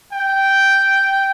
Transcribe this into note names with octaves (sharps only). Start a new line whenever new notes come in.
G5